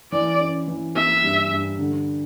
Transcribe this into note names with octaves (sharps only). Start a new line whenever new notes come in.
E3 D5
C#4
E3
A#3 E5
G2
G2
D3